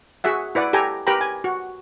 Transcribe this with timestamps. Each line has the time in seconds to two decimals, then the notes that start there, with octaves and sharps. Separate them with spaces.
0.24 F#4 G#4 E5 F#5
0.55 E4 B4 D5 F#5
0.73 G4 A4 G5 G#5 A#5
1.07 G4 A#4 B4 G5 A#5 B5
1.21 G#5
1.44 F#4